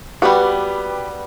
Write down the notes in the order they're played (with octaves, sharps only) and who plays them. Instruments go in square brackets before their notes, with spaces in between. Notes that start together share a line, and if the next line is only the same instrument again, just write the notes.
[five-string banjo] G3 B3 F#4 [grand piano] G4 B4